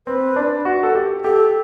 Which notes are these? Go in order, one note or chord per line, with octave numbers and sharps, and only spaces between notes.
C4 B4
D4
F#4
A4
G4
G4 A4